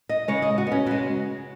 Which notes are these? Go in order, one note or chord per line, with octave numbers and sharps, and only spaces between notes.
D#5
C#3 G#3 C#5
D#5
F#4
B3
C#4
C#3 G#3 F#4